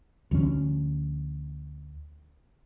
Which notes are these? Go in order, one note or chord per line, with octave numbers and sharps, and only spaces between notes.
D2 F3 C#4